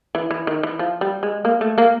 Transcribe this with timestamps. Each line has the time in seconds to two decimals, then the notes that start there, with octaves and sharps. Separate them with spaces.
0.15 E3
0.31 E3
0.47 D#3
0.63 E3
0.79 F3
1.01 G3
1.23 G#3
1.45 A#3
1.61 A3
1.78 A#3